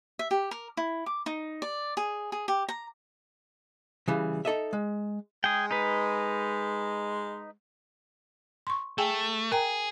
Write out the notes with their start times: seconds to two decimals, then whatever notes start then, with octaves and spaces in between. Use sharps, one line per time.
0.19 E5
0.31 G4
0.51 A#4
0.77 E4
1.06 D6
1.26 D#4
1.62 D5
1.97 G#4
2.32 G#4
2.48 G4
2.69 A#5
4.08 C#3 E3 G3
4.45 D#4 A4 D#5 E5
4.73 G#3
5.44 G#3 G#4 G5
5.71 D#4 B4
8.67 C6 C#6
8.98 A3 G#4 G5 G#5
9.52 G#4 A#4 G5 A#5